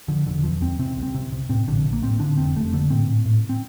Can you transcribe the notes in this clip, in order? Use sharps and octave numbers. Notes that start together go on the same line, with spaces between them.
D3 F3
E1 D3
E2 F3
E2 C4
C3 C4
C2
C4
C3
C3
A2 C4
A#1 D3
A#1
A#3
A2 C4
D3 D4
F1 C4
F1 A3
D3 A#3
A2 C4
A2
A2
C4